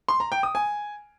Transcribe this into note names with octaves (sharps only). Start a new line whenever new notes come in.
C6
A#5
G5
D#6
G#5